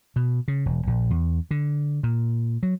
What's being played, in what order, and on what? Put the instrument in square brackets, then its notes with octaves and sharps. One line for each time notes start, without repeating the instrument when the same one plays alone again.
[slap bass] B2
C#3
E1
A#1
E2
D3
A#2
F#3